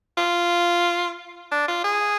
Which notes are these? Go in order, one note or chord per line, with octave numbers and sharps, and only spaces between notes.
F4
D4
F4
G#4